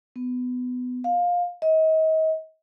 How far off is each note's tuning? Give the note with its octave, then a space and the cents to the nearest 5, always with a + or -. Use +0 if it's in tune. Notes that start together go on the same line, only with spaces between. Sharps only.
B3 +20
F5 +20
D#5 +35